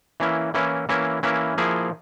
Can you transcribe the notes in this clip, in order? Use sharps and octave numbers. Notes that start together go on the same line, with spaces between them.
E3 A#3 C#4 E4
E3 A#3 C#4 E4
E3 A#3 C#4 E4
E3 A#3 C#4 E4
F3 A#3 E4 G#4